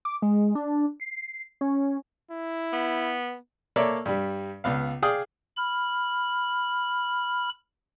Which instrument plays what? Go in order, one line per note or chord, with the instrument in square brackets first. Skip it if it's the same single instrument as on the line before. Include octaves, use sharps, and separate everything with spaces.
[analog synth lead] D6
G#3
D4
C7
C#4
[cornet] E4
[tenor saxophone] B3
[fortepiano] A#3 A4 C#5 D5 E5
G2 G3
C#2 B3 F5
G#4 D5 F5 G5 D#6
[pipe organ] B5 F6